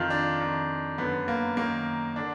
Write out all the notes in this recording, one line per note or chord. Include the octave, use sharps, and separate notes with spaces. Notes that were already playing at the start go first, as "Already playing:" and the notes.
Already playing: F2 D#3 F4
D4
F2 D#3
F#2 D3 B3
A#3
F#2 D#3 A#3
D3 D4